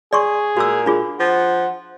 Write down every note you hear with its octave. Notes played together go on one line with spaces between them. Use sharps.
G#4 D5 C6 C#6
A#2 F#4 E6
D4 F4 G#4
F3 F#5